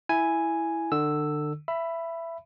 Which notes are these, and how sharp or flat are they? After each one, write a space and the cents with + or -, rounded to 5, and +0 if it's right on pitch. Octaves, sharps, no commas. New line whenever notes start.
E4 +0 G#5 +0
D3 +30 E6 +0
E5 +15 B5 +0